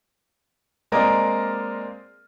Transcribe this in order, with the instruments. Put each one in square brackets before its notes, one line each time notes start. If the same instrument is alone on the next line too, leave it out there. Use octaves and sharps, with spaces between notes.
[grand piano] G#3 A#3 C4 A#4 D5 D#5